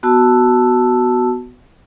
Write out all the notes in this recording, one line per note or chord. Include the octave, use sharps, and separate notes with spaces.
B3 F#4 A5 E6